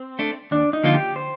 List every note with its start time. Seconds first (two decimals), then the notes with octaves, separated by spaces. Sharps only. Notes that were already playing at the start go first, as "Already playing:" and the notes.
Already playing: C4
0.19 A3 D4
0.51 D#2 D4
0.73 D#4
0.83 D3 F3 A#3 F4
0.94 G4
1.16 C5